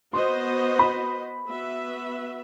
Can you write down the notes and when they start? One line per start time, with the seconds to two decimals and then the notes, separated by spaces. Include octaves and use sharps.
0.13 B3 F#4 C5 D#5 C6
0.79 B5
1.45 B3 F#4 B4 E5